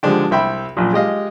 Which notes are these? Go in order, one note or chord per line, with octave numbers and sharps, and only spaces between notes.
D3 F3 G#3 D4 G4
C2 E5 G5 B5
A#1 F#2 A#2
G#3 G4 D#5 F5